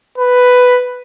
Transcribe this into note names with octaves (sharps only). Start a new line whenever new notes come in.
B4